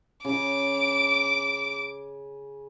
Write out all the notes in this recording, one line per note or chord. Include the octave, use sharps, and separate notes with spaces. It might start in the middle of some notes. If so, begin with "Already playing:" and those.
C#3 D#5 D6